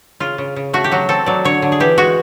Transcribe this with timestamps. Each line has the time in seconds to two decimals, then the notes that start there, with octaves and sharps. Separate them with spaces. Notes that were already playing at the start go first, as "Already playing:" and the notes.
0.20 C#3 F4
0.38 C#3
0.56 C#3
0.74 A3 F#4
0.84 G4
0.92 F#3 F#4
1.09 C4 A4
1.26 F#3 D5
1.45 D3 C#5
1.62 D3
1.72 G#4
1.80 E3 G4
1.97 G#3 F#4